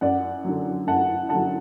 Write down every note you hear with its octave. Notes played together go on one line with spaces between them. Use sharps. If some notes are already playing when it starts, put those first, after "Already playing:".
F#2 D5 F#5
D3 F#3
F#2 F#5 A5
D3 F#3 F#5 A5